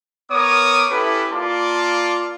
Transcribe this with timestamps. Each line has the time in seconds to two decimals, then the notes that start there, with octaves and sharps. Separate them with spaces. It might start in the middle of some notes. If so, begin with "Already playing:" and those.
0.31 B3 A#4 C#5 D6 D#6
0.91 C#4 E4 G4 A4 B4
1.33 A#3 F4 D5 A5 C6 D6